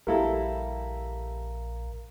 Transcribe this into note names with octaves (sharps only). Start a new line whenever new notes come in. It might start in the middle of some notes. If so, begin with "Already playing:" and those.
A#1 G3 E4 A4 A#4 F5 A#5